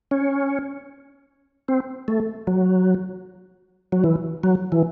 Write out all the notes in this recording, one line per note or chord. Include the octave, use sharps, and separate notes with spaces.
C#4
C4
A3
F#3
F#3
E3
F#3
E3